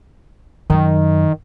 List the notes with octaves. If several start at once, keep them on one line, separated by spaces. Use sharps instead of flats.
F#2 D#3